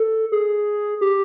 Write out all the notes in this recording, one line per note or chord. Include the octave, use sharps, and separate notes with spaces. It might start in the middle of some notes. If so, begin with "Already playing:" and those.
Already playing: A4
G#4
G4